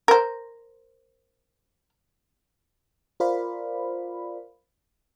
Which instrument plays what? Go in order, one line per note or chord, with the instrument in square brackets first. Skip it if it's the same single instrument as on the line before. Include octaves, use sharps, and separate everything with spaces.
[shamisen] A#4 C5
[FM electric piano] F4 A#4 C5 D5 F5 B5